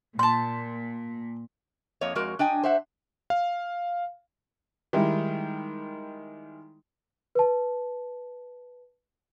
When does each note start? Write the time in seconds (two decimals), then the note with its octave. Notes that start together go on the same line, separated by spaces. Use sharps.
0.19 A#2 A5 C6 G6
2.01 F2 A#3 C#5 D#5
2.15 F2 G#3 F#4 A#4
2.39 D4 D#5 G5 G#5
2.63 C5 E5 F#5
3.30 F5
4.93 D#3 G3 G#3 D#4 E4
7.35 B4 A5